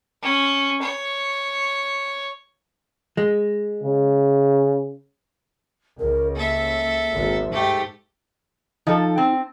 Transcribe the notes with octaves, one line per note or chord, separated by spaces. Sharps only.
C#4
C#5
G#3
C#3
C#2 A#4
A#3 A4 E5
G#1
G#2 A3 G4
F3 D#4 A4
C4